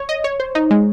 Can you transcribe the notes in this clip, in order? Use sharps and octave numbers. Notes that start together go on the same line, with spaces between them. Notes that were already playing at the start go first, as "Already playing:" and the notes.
Already playing: C#5
D#5
C#5
C5
D#4
G#3